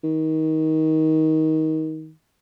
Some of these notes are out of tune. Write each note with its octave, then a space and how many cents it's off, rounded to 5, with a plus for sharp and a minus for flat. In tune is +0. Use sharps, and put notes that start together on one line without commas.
D#3 +20